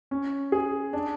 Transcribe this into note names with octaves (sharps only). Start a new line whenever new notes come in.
C#4
G#4
D4